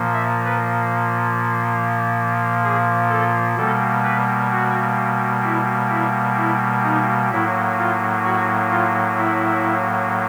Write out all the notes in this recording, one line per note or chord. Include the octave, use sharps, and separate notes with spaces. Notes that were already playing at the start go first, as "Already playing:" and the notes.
Already playing: A#2 F3 A#3
E5
B4
G#4
A4
B2 G3 A#3 A4
B4
F#4
E4
E4
E4
D#4
A2 F#3 A#3 E4
F4
F#4
F4
E4